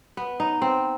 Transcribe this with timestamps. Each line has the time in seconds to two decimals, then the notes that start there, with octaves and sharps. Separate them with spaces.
0.17 B3
0.40 D#4
0.62 C4